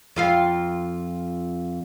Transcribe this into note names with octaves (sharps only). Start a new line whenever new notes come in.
F2 F4 F5